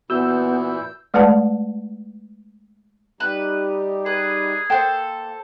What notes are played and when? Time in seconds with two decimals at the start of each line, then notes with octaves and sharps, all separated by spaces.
0.10 A#2 E3 B3 E4 F#4 E6 G6
1.14 G#3 A3 B4 D5 F#5 A5
3.20 G3 D#4 G4 B4
4.06 G#4 B4
4.70 A#3 A4 C5 G5